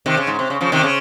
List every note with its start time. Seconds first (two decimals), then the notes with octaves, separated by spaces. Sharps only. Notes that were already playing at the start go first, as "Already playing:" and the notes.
0.06 C3 D#3
0.17 C#3
0.27 G#2
0.39 C3
0.50 C#3
0.61 C#3 F3
0.72 C3 D#3
0.83 C#3